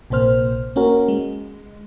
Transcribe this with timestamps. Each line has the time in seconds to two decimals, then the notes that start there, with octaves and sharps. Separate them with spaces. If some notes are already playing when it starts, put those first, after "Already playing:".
0.10 A#1 C3 A#3 C5 F6
0.76 A#3 C#4 F#4 A#4
1.08 G#3